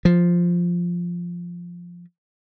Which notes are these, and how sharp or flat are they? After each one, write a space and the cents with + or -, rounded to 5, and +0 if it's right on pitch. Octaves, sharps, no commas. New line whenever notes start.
F3 +0